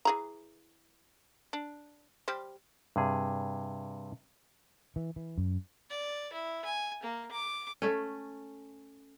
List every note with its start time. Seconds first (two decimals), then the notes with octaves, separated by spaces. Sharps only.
0.05 E3 G#4 A#5
1.53 D4
2.28 G3 G4 C5
2.96 G2 C3 G#4
4.96 E3
5.16 E3
5.38 F#2
5.90 D5
6.33 E4
6.65 G#5
7.03 A#3
7.32 D6
7.82 A3 C#4